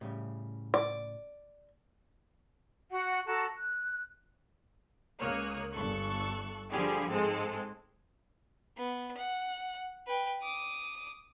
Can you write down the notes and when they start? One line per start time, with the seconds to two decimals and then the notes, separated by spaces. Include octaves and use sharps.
0.01 A2 C#3 G3
0.74 D5
2.91 F#4 F#5
3.27 F#4 A4 A5 A#5
3.56 F#6
5.21 C#2 A#3 C#5 D#6 F#6
5.73 G1 G2 A4 C#6 F#6
6.71 D3 F3 G3 G4 G#4
7.09 G#2 G#3 C4 A4
8.77 B3
9.17 F#5
10.07 B4 G5
10.41 D6 D#6